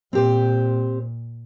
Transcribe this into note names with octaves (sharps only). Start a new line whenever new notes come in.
A#2 C4 G4 C5